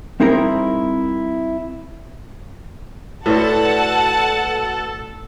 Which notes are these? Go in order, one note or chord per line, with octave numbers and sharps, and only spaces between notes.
G3 C4 D#4 E4 G#4 A#4
A2 F#4 A4 B4 D5 F#5 A5